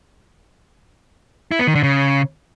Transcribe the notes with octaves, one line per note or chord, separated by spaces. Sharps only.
E4
B3
D#3
D3
C#3